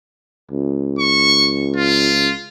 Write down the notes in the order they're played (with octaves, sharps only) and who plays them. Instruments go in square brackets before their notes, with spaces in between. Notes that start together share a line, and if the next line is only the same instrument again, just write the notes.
[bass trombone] C#2
[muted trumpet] C#6
F4